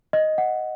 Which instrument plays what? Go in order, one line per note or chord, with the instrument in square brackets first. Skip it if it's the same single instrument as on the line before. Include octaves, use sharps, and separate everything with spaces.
[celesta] D#5
F#5